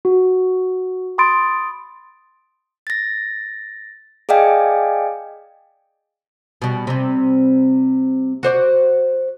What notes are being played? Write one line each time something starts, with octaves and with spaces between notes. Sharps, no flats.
F#4
B5 C6 D#6 A6 D7
A6 A#6
G#4 D5 D#5 F5 G5 G#5
B2 G3
C3 G3
F#4 C5 D5